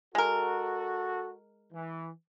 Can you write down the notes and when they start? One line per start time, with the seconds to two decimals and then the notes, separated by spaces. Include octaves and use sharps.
0.15 G#3 F#4 A4 A#4
1.73 E3